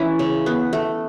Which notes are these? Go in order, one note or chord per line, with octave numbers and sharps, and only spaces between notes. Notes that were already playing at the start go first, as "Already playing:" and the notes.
Already playing: E3 C#4 E4
C#3
B3
A3